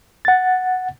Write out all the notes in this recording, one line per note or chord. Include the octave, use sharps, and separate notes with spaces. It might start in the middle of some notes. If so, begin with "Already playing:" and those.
F#5 A6